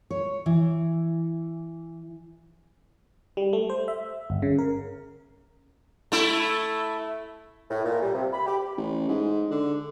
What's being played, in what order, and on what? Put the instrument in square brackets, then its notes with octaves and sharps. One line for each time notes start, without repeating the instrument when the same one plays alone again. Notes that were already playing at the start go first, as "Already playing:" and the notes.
[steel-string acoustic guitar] C#5
E3
[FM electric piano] G3
A3
C5
E5
G1
C#3
A#4
[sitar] A3 E4
[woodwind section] A2
A#2
G3
C3
B5
G4
[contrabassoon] A1
G#2
D3